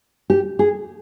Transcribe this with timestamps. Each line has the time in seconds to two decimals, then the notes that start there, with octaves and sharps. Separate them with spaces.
0.30 G4
0.59 G#4